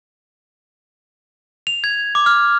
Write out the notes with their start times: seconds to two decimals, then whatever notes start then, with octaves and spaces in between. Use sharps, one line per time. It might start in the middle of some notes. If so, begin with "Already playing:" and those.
1.67 F7
1.84 G#6
2.15 D6
2.26 F6